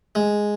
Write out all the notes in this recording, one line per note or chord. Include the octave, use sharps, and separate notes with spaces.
G#3